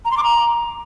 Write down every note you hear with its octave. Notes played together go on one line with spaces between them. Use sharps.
A#5
C6
D6
A#5